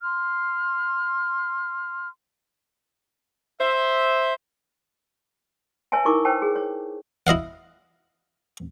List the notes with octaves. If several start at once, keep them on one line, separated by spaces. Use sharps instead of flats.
C6 F6
C5 E5
B4 C#5 E5 G#5 A5
D#4 E4 A#4 C#6 D6
B4 C5 G5 A5
G#4
C#5
E4 D#5 F5 F#5